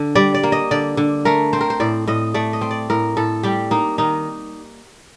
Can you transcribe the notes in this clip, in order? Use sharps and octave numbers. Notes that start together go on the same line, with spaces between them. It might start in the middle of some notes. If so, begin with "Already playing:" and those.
Already playing: D3
G3 D5
D5
A#3
D#5
D3 D5
D3
A3 A#4
C4 C5
A#4
C5
A2 D5
A2 D#5
A3 D5
D#5
C4
D5
A2 A#4
A2 A4
G3 G4
A#3 D#4
D#3 D#4